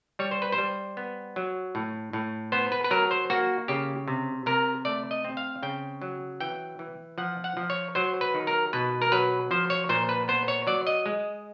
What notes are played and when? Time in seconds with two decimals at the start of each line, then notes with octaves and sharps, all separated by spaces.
0.19 G3 C#5
0.31 C5
0.42 B4
0.52 C5
0.58 G3
0.97 B3
1.36 F#3
1.75 A2
2.13 A2
2.52 B3 C5
2.72 B4
2.84 B4
2.91 F#3 A#4
3.11 C5
3.30 A#3 F#4
3.68 C#3 G4
4.08 C3
4.46 C3 A#4
4.85 A3 D5
5.11 D#5
5.24 C4
5.37 F5
5.63 C#3 G5
6.02 F#3
6.40 E3 G5
6.79 E3
7.18 F3 F#5
7.44 F#5
7.57 F3
7.70 C#5
7.95 F#3 C5
8.21 B4
8.34 D#3
8.47 A#4
8.73 B2 B4
9.02 A#4
9.12 F#3 B4
9.51 F3 C5
9.70 C#5
9.89 A#2 C5
10.09 B4
10.28 B3 C5
10.48 C#5
10.67 F#3 D5
10.87 D#5
11.06 G#3